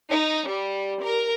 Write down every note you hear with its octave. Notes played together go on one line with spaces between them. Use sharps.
D#4
G3
A#4